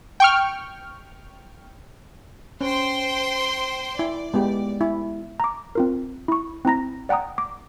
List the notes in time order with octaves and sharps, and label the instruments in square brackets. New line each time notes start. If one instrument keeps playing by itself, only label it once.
[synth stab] G5 C#6 F6
[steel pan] C#4 [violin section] C5 G5 C6
[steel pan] E4 [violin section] D5
[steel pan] G#3 B3 G4
E4
[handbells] A#5 D6
C4 F4 A#4
E4 C#6
C4 E4 A#5 A#6
D5 F#5 G5 A#5 D#6
D6